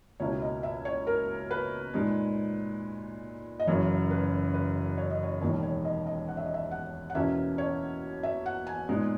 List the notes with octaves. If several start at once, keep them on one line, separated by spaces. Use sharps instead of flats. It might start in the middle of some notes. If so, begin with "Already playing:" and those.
C#2 B2 A#3 E4 C#5
D#5
E5
C#5
A#4
B4
A#2 G#3 D#4
D#5
F#1 F#2 C#3 E3 C#5
B4
B4
C#5
D#5
C#5
E1 D#2 D#3 C#5
C#5
D#5
D#5
F#5
E5
D#5
E5
F#5
F#5
E2 B2 A#3 C#4 E4 E5
C#5
E5
F#5
G#5
A#2 G#3 B3 D#4